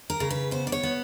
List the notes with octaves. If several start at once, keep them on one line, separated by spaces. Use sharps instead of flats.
A#4
C#3
B4
B3 C5
D5
C#5
B3